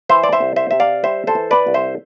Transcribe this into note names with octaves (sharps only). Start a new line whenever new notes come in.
E3 C5 E5
D5
C5 E5
C2
C5 E5
C3 E5
D5 F5
G3 C5 E5
A4 C5
E3
B4 D5
C2
C5 E5